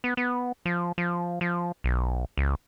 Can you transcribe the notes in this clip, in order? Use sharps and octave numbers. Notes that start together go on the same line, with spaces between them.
B3
B3
F3
F3
F3
B1
C#2